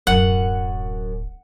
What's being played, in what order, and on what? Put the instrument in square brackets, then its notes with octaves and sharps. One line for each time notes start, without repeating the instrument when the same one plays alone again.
[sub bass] D1 [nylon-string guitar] F#2 [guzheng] F#5